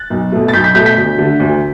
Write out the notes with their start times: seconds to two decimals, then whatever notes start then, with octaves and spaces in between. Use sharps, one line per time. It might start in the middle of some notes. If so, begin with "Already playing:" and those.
Already playing: F#6 A6
0.10 B1
0.32 B2 A3
0.48 A6
0.53 B1 G6 B6
0.64 G6 B6
0.75 B2 A3 G6 B6
0.86 G6 B6
0.96 D2
1.18 D3 A3
1.40 D2